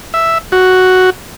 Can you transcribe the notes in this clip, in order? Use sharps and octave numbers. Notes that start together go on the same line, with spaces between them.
E5
F#4